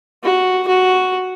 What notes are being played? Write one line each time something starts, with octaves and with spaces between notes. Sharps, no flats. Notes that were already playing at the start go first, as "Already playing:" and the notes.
F#4
F#4